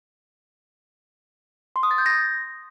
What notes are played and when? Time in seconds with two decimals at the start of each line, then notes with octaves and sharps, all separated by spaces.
1.76 C6
1.83 D#6
1.91 A6
1.98 G6
2.06 A#6